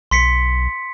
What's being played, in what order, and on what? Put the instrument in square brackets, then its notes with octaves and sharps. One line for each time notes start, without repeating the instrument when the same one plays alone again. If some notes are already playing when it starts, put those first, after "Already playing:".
[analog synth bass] B1 [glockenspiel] C6 B6 C#7